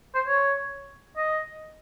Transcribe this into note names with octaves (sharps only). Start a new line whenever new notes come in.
C5
C#5
D#5